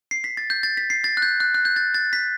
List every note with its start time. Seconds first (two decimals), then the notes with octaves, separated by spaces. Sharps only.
0.11 C7
0.24 B6
0.37 A6
0.50 G6
0.63 A6
0.77 B6
0.90 C7
1.04 A6
1.17 F#6
1.22 G6
1.40 F#6
1.55 F#6
1.65 G6
1.76 A6
1.94 A6
2.13 B6